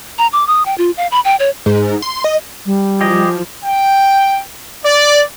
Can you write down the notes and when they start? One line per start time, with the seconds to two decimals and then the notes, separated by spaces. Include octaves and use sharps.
0.18 A#5
0.33 D6
0.47 D#6
0.66 G5
0.78 F4
0.97 F5
1.11 B5
1.25 G5
1.40 C#5
1.66 G#2
2.02 C6
2.24 D#5
2.66 G3
3.01 F3 G4 G#4 D#5
3.64 G5
4.85 D5